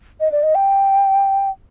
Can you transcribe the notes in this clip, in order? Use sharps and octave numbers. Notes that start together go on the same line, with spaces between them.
D#5
D5
D#5
G5